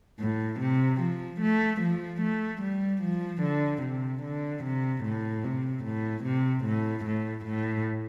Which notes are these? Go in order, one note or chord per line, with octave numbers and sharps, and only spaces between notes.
A2
C3
F3
A3
F3
A3
G3
F3
D3
C3
D3
C3
A2
C3
A2
C3
A2
A2
A2